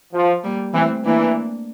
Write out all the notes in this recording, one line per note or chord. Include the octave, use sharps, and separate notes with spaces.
F3
G3 A#3
E3 A3 C4
E3 A#3 D4